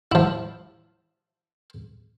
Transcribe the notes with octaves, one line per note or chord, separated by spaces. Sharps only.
F3 E4